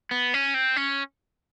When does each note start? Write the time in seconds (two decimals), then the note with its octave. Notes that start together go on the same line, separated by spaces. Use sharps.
0.11 B3
0.34 C#4
0.54 C4
0.76 C#4